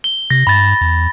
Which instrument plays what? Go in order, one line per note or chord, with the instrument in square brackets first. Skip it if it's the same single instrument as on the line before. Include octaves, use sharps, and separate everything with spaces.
[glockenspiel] G7
[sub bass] C3 [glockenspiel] A#6
[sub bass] G2 [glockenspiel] B5 A6
[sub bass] E2